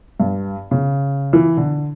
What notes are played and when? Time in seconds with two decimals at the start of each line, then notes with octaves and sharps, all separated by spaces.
0.20 G2
0.71 C#3
1.33 E3
1.57 D3